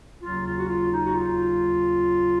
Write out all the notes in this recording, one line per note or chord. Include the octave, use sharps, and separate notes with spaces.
D#2 C#3 F#3 C#4 F4
F4
F#4
F4
D#4
F#4
F4